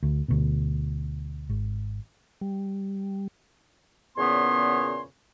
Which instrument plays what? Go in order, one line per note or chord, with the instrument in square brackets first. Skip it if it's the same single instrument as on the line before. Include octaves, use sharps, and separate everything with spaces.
[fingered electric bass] D2
D2 B2
G#1
[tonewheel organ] G3
[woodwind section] E2 A#2 C#3 B3 C#5 C6